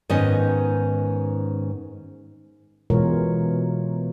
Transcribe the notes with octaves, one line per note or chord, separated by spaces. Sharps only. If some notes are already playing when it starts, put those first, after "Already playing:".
G#2 D#3 B3 C#4 D#5
B2 E3 G#3 F4 A#4 C#5